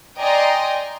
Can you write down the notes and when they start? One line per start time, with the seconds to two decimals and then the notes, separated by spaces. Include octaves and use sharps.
0.19 D5 D#5 G5 G#5 A#5 C6